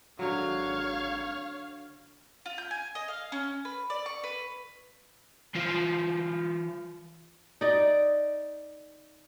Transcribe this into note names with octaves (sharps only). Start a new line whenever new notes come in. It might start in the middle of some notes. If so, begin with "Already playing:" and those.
G#1 D3 F#3 C#5 F5
F4
G6
G#5
D#5
F5
C#4
B4
D5
C#6
B4
E3 F4 C5
D#4 D5